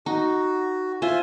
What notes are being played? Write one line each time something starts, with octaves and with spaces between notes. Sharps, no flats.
D#4 F#4
F4 C5 E5 G#5